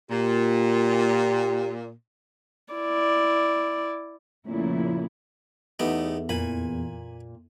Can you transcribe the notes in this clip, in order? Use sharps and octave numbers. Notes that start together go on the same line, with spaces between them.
A#2 G4
E4 D5
F2 A#2 C#3 A3 E4
E2 A3 B3 D#4 G4
F2 A#2 G#5 B5